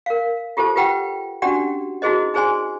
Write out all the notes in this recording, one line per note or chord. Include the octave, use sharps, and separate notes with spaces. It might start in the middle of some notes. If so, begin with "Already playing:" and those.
A#4 F5
F4 G4 A4 C5 A5
F4 G4 B4 F#5 G5 B5
C#4 D4 F#4 G4 D5 F#5
D#4 E4 F#4 G#4 C5 D#5
D#4 G#4 C5 D5 G#5 C6